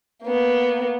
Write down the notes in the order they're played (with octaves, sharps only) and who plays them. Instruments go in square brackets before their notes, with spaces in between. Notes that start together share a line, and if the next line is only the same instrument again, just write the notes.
[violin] A#3 B3